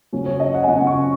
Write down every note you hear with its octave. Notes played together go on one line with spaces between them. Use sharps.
C#3 F#3 C#4
C#5
D#5
F#5
G#5
C#3 F#3 C#4 F#5
C#6